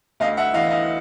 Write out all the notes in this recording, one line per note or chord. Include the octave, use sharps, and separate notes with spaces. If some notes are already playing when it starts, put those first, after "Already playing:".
D2 D#5 F5
E5 F#5
E3 D#5 F5
D#5 F5